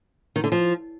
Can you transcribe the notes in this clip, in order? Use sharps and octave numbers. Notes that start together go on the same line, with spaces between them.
D#3
D3
F3